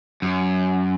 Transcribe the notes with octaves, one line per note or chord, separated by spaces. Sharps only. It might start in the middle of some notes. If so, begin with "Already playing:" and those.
F#2